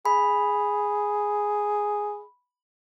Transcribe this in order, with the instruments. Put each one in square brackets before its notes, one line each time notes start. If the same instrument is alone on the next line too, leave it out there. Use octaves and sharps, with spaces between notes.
[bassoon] G#4 [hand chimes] B5